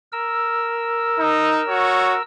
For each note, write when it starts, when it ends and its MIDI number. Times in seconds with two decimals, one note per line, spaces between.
0.12 2.22 70
0.12 2.22 88
1.17 1.60 63
1.66 2.14 66
1.66 2.14 73